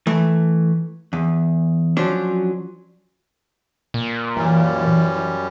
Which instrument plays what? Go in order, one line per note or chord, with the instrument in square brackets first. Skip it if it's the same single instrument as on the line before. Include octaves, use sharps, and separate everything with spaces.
[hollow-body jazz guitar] E3 A3
E2
F3 F#3 C#4 D4 C5
[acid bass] A#2
[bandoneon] F#2 G3 C#4 [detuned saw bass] E3